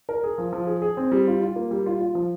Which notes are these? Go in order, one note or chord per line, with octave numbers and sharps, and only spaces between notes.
A#4
G#4
F3
F3
G#4
G#4
C4
G3
F4
F4
A#3
G3
F4
F4
F3